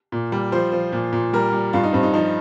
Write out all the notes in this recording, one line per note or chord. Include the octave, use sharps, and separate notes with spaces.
A#2
G3
F3 C5
F3
A#2
A#2
G3 A#4
G3
G2 F4
D#4
G2 C4
D#4
F3 D#4